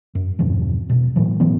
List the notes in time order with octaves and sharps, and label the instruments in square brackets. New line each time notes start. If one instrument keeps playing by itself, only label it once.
[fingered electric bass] F#2
E2 G2 B2 F3
E1 B1 B2
A2 E3 F#3
G#1 A2 E3 B3